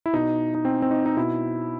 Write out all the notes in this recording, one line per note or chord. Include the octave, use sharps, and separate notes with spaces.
E4
B2 D#4
D#4
C4
C4
D#4
D#4
B2 E4